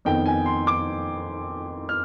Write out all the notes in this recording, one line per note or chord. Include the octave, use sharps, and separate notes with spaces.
F2 D#3 B3 G5
G#5
C6
D6
F6